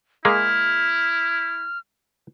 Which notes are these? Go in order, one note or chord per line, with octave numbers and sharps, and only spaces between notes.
G#3 A#3 E4 G#4 F6